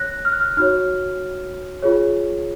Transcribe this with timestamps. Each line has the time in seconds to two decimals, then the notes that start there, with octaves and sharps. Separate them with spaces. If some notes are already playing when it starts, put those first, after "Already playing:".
Already playing: C#5 F#6 A#6
0.25 F6
0.32 F#6
0.40 F6
0.57 D#4 F#4 C#5 F6
1.82 F4 G#4 C#5